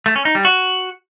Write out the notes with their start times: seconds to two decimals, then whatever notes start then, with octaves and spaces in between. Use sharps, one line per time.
0.06 A3
0.16 C#4
0.25 D#4
0.35 G3
0.45 F#4